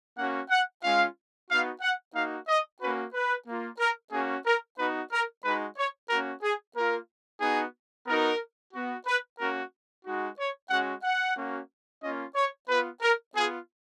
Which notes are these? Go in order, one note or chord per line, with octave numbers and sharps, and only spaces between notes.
A#3 C#4 F#4 F#5
F#5
G#3 C#4 F4 F5
B3 D#4 F#4 F5
F#5
A#3 D#4 F#4 F5
D#5
A#3 C#4 F#4 B4
B4
A#3 F4
A#4
A#3 C#4 F#4 G#4
A#4
B3 D#4 F#4 B4
A#4
G#3 D#4 F#4 B4
C#5
A#3 C#4 F#4 A#4
G#4
A#3 F4 A#4
B3 D#4 F#4 G#4
B3 D#4 F#4 A#4
B3 F#4
B4
A#3 C#4 F#4 A#4
G#3 D#4 F#4
C#5
G#3 C#4 F#4 F#5
F#5
A#3 C#4 F#4
A#3 C#4 F4 D#5
C#5
B3 F4 B4
A#4
B3 F4 G#4